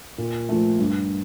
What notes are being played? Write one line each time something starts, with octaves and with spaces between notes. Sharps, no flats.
A#2
F3 A3
G2